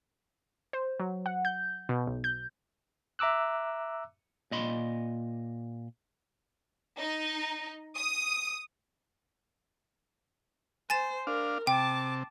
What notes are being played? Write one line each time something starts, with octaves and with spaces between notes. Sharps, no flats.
C5
F#3
F#5
G6
B2
B1
G6
E5 A#5 D6 E6 F#6
A#2 D#5 B5 C6
D#4
D#6
C5 G#5 A6 E7
D4 A#4 F5
C3 G5 A5 D6